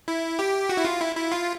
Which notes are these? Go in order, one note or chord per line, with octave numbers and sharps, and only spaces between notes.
E4
G4
F#4
E4
F4
E4
E4
F4